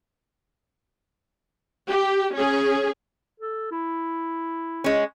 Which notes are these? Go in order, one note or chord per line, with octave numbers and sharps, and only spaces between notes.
G4
C#4 G#4
A4
E4
G#3 C#4